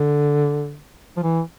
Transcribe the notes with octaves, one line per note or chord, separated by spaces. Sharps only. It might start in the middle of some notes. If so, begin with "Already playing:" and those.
Already playing: D3
F3
E3